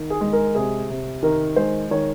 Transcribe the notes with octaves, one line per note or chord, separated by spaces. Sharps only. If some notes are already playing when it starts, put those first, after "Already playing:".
Already playing: D#3
G#4
G#3
A#4
C3 G#4
C3
D#3 A#4
G#3 C5
D#3 C#5